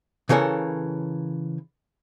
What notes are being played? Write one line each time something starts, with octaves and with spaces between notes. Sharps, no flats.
C#3 E3 A4 A#4 C#5